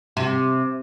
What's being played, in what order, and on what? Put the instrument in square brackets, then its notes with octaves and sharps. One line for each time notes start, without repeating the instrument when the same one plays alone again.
[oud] C3